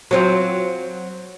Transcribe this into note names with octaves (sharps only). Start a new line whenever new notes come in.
F#3 C4 F4